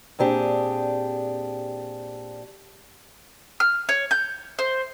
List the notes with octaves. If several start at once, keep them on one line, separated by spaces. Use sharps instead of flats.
A#2 C4 D4 G4 G#4
F6
C#5
G6
C5